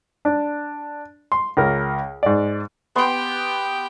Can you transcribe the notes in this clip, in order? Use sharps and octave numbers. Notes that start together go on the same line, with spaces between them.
D4
C6
C#2 A#4
G#2 D5
B3 G4 G5 C6